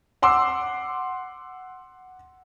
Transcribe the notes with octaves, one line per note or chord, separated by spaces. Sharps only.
F#5 C6 D6 E6